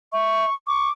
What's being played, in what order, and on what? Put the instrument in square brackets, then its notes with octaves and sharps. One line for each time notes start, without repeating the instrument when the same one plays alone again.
[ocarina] E5 [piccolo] C#6
[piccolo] C#6 [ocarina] D6